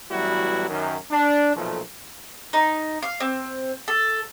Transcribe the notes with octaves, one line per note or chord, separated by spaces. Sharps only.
A1 F#3 G3 B3 E4 F#4
F#2 D#3
D4
B1 A#2 F3 A3
D#4
F5
C4
A4